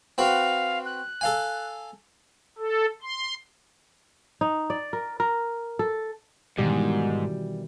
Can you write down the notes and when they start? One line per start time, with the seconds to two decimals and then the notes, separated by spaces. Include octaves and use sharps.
0.18 C4 F#4 B4 F5
0.85 F#6
1.21 A4 F5 G#5
2.58 A4
3.02 C6
4.41 D#4
4.70 D5
4.93 A#4
5.20 A#4
5.79 A4
6.58 G#2 B2 D#3 E3 G3